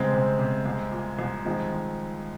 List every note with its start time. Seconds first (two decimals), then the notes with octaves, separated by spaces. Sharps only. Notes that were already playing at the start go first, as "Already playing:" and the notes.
Already playing: C2 C#3 G#3 C4
0.13 C3
0.39 C3
0.66 C2
0.92 A#2
1.19 C2
1.45 D#3 F3 G#3
1.72 D#3